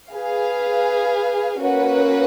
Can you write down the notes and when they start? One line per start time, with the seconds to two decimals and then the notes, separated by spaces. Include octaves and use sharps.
0.11 G#4 B4 F5
1.60 A#3 C#4 F#4 B4 F#5